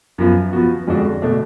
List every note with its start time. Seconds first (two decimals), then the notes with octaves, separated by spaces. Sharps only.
0.18 F#2 F3 B3 F4
0.53 F3 B3 F#4
0.87 F2 D3 G#3 D4 F#4
1.22 B2 A3 D4